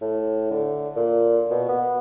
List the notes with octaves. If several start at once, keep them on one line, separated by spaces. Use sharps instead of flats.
A2
D3
A#2
B2
B3